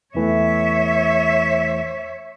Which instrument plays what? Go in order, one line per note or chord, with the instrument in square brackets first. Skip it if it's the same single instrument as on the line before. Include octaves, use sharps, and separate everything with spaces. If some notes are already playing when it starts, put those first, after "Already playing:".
[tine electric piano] E2 E3 A3 [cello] C#5 E5